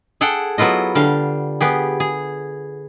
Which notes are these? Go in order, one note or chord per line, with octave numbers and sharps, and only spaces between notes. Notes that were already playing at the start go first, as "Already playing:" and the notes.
G#4 A4 F#5 G5
F#3 B3 E4 F4 D#5
D3 G3 F5
B3 G4 G#4
G#4